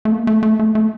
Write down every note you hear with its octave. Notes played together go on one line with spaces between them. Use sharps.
A3
A#3
A3
A3
A3
A3